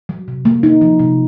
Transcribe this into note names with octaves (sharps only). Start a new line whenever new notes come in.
F#3
C3
A#3
D#4
F3
C3